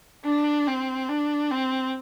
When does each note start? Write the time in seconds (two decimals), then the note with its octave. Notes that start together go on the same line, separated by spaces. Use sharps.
0.24 D4
0.67 C4
1.09 D4
1.50 C4